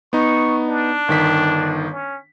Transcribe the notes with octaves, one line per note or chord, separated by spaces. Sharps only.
B3 D#4 C#6
D4
G1 D#3 B6
C#4